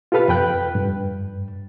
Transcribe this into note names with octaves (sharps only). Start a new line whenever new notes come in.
F4 G4 A4 B4 F5
F2 B4 G5 F#6
G2